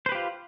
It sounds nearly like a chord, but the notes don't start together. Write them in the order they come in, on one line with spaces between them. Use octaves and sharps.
C5 B4 G4 F4